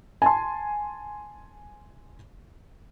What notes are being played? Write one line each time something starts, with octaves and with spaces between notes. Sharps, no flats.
G#5 A5 C6